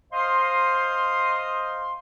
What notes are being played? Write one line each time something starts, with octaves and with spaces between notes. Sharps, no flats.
C5 D#5 F5 C6